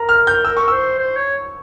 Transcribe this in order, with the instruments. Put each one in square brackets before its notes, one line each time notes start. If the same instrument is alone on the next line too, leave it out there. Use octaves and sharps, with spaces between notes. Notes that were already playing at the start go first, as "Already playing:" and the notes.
Already playing: [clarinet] A#4 [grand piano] A#5
[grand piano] F6
G6
[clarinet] A#4 [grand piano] E6
[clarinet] A#4 [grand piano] C#6
[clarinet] C5 [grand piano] E6
[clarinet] C5
C#5